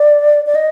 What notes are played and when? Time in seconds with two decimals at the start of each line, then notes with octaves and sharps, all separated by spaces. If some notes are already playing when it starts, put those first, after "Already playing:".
Already playing: D5
0.46 D5
0.55 D#5